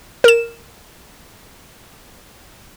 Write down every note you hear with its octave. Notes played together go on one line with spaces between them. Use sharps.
A#4 E7